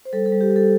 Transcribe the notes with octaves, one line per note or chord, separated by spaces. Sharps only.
C5
G3 A4
A4
G3
G4
G3
A4